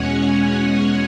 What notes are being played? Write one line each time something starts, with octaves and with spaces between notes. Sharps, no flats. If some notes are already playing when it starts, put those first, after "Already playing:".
Already playing: E2 B2 G#3 C#4 C#5 F#5 G#5